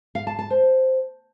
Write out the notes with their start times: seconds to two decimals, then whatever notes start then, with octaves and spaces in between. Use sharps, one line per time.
0.15 F5
0.27 A5
0.39 A5
0.50 C5